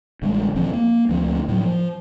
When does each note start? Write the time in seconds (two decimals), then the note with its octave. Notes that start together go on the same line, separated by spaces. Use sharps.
0.22 A1 D3 G3 G#3
0.55 E1 E3 F3 C4
0.74 A#3
1.09 D2 F3 B3 C4
1.48 A2 F#3
1.64 F3